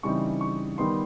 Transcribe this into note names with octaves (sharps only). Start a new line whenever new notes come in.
C#3 E3 G3 C4 D#4 C#6
C#6
D#3 G3 B3 D#4 C6